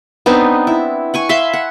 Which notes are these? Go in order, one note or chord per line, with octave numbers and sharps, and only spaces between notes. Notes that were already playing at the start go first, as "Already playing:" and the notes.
B3 C4 D4 D#4
E4
F#5 G#5 C#6
E5 F5 B5 C6
F#5